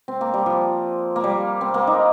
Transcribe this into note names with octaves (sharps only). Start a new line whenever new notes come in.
C4
A#3
G3
F3
A#3
G3
C4
A#3
D#4